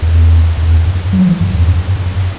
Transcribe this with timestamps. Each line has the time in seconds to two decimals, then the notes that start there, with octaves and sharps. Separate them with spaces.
0.02 E2
0.57 E2
0.85 F#2
1.13 F#3
1.27 E3
1.41 F#2
1.54 E2
1.68 F#2
1.96 F#2